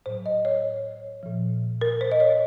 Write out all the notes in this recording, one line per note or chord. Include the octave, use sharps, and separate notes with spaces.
A2 F#3 C5
D#5
C#5
A#2 F3
A#4
C5
D#5
C#5